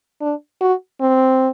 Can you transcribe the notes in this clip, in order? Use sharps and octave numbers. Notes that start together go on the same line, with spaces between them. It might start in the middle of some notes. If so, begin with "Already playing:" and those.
D4
F#4
C4